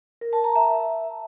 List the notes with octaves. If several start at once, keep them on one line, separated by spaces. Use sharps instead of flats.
A#4
A5
A#5
E5